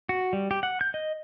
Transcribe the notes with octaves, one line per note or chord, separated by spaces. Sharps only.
F#4
G3
G4
F#5
G6
D#5